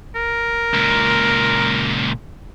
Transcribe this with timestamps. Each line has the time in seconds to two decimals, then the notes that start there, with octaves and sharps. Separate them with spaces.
0.15 A#4
0.74 C#2 A#2